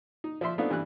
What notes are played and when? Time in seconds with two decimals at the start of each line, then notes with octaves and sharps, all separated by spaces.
0.24 D#4
0.41 F3 D5 E5 C6
0.58 A3 B3 C4 D4 D#4 F4
0.70 G2 E3 D4 F#6